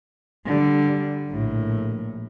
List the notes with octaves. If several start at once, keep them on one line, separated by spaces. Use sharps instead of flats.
D3 G3
A#1 A2